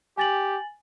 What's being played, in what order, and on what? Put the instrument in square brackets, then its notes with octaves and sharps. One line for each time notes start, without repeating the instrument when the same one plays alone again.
[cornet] G4 [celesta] G#5 A6 F#7